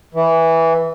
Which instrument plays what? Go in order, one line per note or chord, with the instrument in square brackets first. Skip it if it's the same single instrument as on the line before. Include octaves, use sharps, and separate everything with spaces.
[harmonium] E3